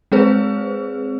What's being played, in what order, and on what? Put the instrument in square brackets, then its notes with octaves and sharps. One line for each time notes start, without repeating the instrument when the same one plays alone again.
[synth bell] G#3 C4 G#4 B4 C5